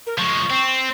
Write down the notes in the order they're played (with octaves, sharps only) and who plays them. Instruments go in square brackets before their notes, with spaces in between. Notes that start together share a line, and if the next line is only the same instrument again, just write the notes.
[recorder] A#4
[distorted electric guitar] F3 G#3 [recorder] C#6
[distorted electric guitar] C4